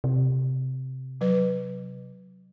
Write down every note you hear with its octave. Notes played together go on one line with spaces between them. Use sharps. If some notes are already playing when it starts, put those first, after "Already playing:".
C3
F#3 B4